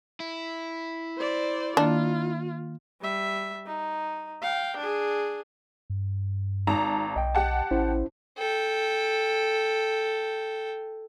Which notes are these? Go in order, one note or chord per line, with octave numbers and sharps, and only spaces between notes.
E4
C5 D5
D#3 A#3 D4 F4
G3 E5
D#4
F5 G5
D4 G#4
G2
G#1 D#4 A5 A#5
B1 D#5 G5
G4 F#5 A5
A1 C#4 E4 C5
A4 G5